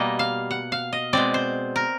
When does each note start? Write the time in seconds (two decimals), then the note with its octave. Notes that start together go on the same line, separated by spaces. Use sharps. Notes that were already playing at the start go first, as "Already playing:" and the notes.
Already playing: B2 G3 A#3 D#5
0.19 F5
0.51 F#5
0.72 F5
0.93 D#5
1.13 B2 G#3 C4 D5
1.34 C5
1.76 A#4